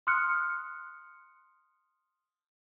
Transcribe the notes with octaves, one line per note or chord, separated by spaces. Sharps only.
C6 D#6 F6 F#6 C#7